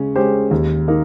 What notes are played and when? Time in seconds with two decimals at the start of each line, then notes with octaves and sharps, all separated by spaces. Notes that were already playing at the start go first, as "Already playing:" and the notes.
Already playing: C#3 G#3 C#4
0.16 G#3 C#4 G4 C5
0.51 D#2
0.88 A#3 D#4